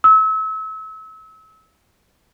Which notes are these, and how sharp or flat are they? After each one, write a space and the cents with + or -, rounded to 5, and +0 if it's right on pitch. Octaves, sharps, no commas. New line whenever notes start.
E6 -35